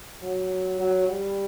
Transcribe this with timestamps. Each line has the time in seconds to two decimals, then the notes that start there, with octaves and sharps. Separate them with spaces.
0.23 F#3
0.79 F#3
1.08 G3